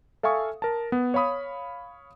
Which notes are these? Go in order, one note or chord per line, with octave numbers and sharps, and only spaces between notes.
A4 E5 F5 G#5 C#6 D#6
A#4 A5
B3
C#5 F5 B5 D#6